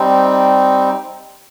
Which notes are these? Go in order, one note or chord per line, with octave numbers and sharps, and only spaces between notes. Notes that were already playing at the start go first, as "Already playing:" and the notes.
Already playing: G3 C4 D#4